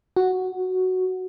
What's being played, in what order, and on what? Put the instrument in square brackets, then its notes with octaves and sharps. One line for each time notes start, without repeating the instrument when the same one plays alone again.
[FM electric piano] F#4